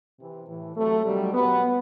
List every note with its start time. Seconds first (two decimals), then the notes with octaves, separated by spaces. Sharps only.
0.18 C3 E3
0.47 A2 E3
0.76 C3 F#3 A3
1.04 C3 D#3 F#3 G3
1.33 B2 F#3 B3